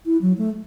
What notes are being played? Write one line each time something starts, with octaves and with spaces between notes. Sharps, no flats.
E4
F#3
A3